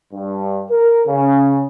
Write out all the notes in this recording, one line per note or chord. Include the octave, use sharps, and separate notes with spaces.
G2
A#4
C#3